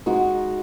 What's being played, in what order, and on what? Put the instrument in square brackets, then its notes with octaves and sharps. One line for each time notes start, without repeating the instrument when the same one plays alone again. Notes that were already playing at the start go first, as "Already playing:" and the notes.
[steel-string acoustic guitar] G#3 D#4 F#4